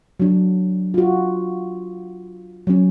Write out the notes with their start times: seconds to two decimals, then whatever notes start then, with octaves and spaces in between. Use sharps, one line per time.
0.20 F#3 D4
0.94 F4 F#4
2.67 F#3 C#4